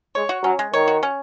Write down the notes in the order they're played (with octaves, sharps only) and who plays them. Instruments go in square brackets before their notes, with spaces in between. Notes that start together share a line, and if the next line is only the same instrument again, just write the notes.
[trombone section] G#3 [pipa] C#5
[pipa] F#4
[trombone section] F#3 [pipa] C#4
[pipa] G#3
[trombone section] D#3 [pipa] C#5
[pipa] F#4
C#4